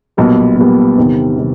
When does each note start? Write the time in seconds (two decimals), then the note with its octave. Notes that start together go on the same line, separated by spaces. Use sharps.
0.17 B1 A#2 G3 B3
0.57 B1 A#2 G3 B3
0.98 E2 C3 D#3 G3
1.37 C3 D#3 G3